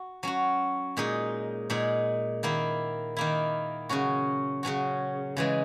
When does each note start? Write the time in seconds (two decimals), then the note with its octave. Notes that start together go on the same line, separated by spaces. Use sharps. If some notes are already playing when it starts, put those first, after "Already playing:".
Already playing: F#4
0.23 F#3 C#4 F#4
0.97 A#2 G#3 D#4
1.70 A#2 G#3 D#4
2.43 D#3 A#3 E4
3.17 D#3 A#3 E4
3.89 C#3 F#3 C#4 F#4
4.63 C#3 F#3 C#4 F#4
5.37 C#3 E3 G#3